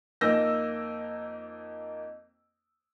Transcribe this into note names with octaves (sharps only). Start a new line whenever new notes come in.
F2 A#3 D#4 E6 G6 A#6